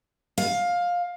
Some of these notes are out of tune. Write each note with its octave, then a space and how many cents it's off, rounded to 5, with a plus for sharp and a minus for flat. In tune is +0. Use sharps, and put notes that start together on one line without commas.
F5 +15